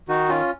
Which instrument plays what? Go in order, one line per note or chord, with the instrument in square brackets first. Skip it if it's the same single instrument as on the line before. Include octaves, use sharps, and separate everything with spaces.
[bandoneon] D#3 D#4 F#4
C#4 F4